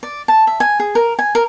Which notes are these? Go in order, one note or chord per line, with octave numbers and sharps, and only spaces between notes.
D5
A5
E5
G#5
G#4
A#4
G#5
A#4